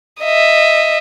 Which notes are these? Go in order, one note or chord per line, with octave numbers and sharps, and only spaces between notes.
D#5 E5